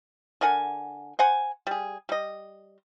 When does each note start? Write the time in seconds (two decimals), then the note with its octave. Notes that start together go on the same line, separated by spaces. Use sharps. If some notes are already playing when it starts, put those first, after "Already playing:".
0.41 D3 A#4 F#5 G#5
1.19 C5 F#5 G#5
1.67 G3 G#4
2.09 G3 D#5